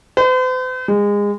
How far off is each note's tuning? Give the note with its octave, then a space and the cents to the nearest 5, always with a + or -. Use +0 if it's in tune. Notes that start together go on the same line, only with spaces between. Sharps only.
C5 -45
G#3 -25